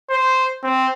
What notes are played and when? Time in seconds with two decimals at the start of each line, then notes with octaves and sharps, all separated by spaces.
0.10 C5
0.63 C4